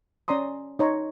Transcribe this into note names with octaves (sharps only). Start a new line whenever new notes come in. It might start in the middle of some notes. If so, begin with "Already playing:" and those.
C#4 D5 A#5 C6 D#6
D#4 C#5 A#5 C6